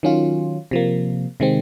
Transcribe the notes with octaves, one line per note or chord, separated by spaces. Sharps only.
D#3 F#3 C#4 F4
C3 F3 A#3
C3 D#3 G#3 C4